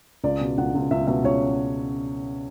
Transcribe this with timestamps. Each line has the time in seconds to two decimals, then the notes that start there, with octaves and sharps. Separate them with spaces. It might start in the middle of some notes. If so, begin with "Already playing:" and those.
0.24 C#2 D5
0.41 B2
0.58 C#2 F#5
0.75 C#2
0.91 C#2 E5
1.07 B2 E5
1.24 C#2 C#5